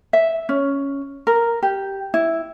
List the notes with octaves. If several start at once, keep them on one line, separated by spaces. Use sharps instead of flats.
E5
C#4
A#4
G4
E4